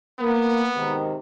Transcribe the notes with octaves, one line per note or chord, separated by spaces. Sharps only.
A#3 B3
G#2 C3 D#3